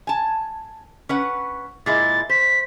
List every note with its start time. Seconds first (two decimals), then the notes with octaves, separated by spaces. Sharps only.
0.07 G#5 A5
1.09 C#4 B4 F#5
1.86 A#2 G#3 E4 A6
2.29 C5 B6